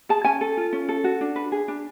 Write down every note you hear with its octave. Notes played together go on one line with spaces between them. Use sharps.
G#4 A5
C#4 G#5
A4
F4
C#4
A4
F#4
D4
B4
G#4
D4